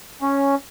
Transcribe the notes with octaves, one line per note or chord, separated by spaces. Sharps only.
C#4